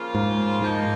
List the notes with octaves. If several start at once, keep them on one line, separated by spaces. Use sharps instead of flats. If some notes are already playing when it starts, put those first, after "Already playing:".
Already playing: C#3 F3 A#3 F4
G#2
G#2 F3 A#3 D#4